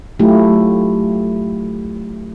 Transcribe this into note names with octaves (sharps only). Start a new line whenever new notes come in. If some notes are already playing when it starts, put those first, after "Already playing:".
F#3 A3 E4 F4 G4